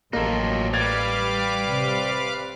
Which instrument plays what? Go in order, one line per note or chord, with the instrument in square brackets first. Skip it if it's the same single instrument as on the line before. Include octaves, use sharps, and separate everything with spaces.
[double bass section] A1 [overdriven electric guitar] F3 D#4 [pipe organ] F#3 [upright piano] A#3 A4
[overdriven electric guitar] G3 [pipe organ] B4 F5 D6 [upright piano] G#6 A6 F7
[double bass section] C3